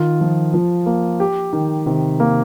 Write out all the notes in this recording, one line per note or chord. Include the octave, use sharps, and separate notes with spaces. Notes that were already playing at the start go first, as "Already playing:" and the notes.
Already playing: D#3 F4
F3
F3
A#3
G4
D#3
C3 D#3
A#3